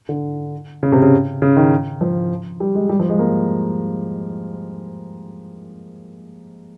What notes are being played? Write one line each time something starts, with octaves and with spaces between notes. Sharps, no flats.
D3
C#3
C3
C#3
C#3
D#3
F3
G3
G#3
G3
F3
G#3
A#3